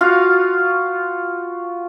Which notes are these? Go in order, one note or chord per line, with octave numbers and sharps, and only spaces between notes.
F4 F#4 F5